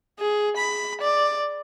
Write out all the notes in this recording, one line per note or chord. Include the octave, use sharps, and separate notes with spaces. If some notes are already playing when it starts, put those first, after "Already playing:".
G#4
B5
D5